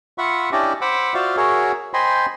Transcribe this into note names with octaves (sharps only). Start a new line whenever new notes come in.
F4 E5 F#5 B5 C#6
C#4 D4 E4 G4 D5 D#5
C5 F#5 B5 D6 E6
F4 F#4 C5 D5 E5 F5
F#4 G#4 A#4 C#5 E5
C5 D#5 G5 G#5 B5 C6